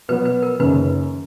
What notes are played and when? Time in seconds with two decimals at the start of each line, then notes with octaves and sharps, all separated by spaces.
0.09 B2 F#3 B3 B4
0.26 B4
0.42 A#4
0.60 F#1 F#2 D#3 B4